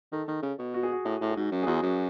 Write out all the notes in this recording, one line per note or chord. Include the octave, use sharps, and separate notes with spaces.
D#3 A4
D#3
C#3
B2
F#4
G#4
F#4
A2
A2
G#4
G#2 F#4
F#2
G#4
E2 F#4
F#2